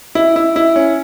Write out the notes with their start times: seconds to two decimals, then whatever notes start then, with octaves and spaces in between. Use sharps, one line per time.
0.15 E4
0.36 E4
0.56 E4
0.76 C#4